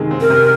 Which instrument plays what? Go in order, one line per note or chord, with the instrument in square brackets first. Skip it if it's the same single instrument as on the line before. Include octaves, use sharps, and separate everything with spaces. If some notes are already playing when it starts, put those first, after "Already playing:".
Already playing: [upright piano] C3 D#3 G#3 C4
C4
[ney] A#4
[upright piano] C3